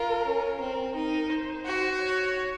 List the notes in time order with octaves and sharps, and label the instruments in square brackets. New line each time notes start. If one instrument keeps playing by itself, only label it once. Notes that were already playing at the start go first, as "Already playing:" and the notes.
Already playing: [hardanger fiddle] F4 [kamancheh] A#4
[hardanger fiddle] C#4
[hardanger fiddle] C4 [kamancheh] A#4
[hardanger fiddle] D#4
[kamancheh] C5
[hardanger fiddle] F#4
[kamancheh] C#5